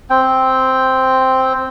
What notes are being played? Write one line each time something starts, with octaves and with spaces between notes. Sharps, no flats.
C4 G5